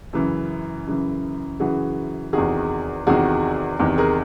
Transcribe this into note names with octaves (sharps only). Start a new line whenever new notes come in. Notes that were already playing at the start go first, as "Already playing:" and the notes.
F#2 C#3 E3
F#2 C#3 E3
F#2 C#3 E3 F#4 G#4
E2 C3 D#3 F#4 G#4
E2 C3 D#3 F#4 G#4
E2 C3 D#3
G#4 A#4